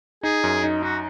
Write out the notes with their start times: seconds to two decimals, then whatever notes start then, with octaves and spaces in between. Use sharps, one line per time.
0.23 D#4 G#4
0.44 F#2
0.64 D#4
0.83 D#4 F#4